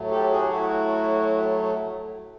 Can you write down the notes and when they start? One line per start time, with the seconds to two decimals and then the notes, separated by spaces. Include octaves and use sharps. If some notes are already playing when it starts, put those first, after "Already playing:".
Already playing: A2 F#3 A3
0.11 G4 A4
0.32 F#4 G#4
0.51 E4 F#4